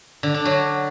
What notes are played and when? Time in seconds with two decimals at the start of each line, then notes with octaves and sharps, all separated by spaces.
0.23 D3
0.34 D4
0.45 F#3